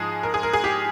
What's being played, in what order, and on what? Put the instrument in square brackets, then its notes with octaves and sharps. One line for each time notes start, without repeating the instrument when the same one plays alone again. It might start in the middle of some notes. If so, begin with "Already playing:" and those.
Already playing: [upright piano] G#2 F3 G#3 G#4
A#4
G#4
A#4
G#4
G4